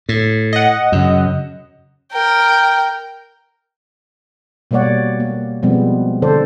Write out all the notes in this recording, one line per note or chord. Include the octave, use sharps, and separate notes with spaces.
A2
D#5 F#5
F#2 C#3
A#4 G5
B2 G3 A#3 C#5 D5 F#5
A#3
B2 F3 G3 G#3 B3 C4
D3 A4 C5 D5